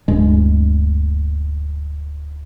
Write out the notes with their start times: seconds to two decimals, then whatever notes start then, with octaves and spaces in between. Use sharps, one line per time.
0.08 D1 G2 G#3